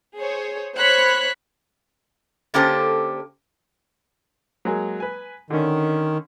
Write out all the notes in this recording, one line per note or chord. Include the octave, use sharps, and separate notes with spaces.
G#4 C5 C#5
C5 C#5 B5 F#6 B6
D3 A#3 C#4 G4 A4 C5
F#3 G#3 A#3
B4 G#5
D3 D#3 C#4